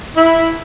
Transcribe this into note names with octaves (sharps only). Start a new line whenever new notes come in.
E4